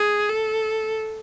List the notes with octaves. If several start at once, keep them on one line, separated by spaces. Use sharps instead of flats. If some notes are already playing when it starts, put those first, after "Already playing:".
Already playing: G#4
A4